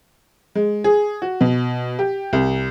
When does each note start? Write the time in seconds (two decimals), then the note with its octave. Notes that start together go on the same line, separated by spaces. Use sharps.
0.55 G#3
0.84 G#4
1.22 F#4
1.41 B2
1.99 G4
2.33 C2